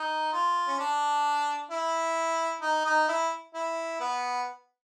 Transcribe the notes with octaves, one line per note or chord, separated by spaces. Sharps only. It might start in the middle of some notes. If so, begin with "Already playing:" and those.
Already playing: D#4
F4
C#4
D4
E4
D#4
D#4
E4
E4
B3